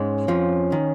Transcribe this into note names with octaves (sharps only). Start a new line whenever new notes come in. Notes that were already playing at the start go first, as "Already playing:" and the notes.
Already playing: G#2 G#3 C#4
F2 F3
D#3